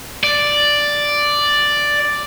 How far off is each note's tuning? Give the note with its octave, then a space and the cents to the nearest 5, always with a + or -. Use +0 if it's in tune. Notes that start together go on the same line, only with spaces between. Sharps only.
D5 +0